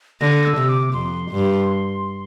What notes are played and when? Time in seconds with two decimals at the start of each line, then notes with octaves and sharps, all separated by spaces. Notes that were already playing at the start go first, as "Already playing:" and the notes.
0.21 D3 A#6
0.45 E6
0.57 C3
0.69 D6
0.94 F2 C6
1.31 G2